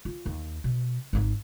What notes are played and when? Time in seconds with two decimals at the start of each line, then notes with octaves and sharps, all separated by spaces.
0.05 F4
0.26 D#2
0.64 B2
1.13 G#1 D#4